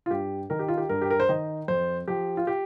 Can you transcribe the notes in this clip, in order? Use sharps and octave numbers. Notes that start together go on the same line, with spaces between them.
F4
G2 G4
D#3 A#4
G4
F4
G4
G2 A#4
G4
A#4
C5
D#3 D#5
F2 C5
F3 G4
F4
G4